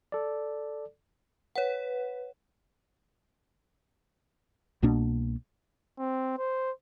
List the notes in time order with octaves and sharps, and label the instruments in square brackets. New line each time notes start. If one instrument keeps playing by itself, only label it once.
[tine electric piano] A4 D5
[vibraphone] B4 [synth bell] C#5 F#5
[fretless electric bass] C2 B2 A#3 D4
[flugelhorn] C4
C5